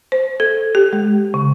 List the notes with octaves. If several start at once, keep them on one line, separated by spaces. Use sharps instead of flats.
C5
A4
G4
G#3
C#3